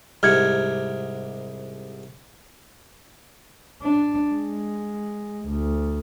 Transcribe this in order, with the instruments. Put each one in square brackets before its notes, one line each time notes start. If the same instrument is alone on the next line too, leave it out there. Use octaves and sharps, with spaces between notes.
[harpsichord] C2 G#2 C3 [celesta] F6 G#6 C#7
[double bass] D4
G#3
D2